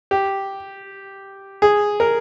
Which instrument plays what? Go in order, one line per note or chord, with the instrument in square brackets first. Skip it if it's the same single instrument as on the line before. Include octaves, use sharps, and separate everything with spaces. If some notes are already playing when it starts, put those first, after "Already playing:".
[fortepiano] G4
G#4
A#4